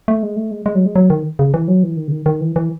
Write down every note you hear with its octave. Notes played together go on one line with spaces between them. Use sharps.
A3
G#3
A3
G#3
G#3
F#3
G#3
F#3
D#3
C#3
E3
F#3
E3
D#3
C#3
D#3
D#3
E3
E3